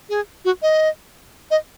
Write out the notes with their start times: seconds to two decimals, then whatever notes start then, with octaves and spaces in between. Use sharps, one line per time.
0.09 G#4
0.45 F#4
0.62 D#5
1.51 D#5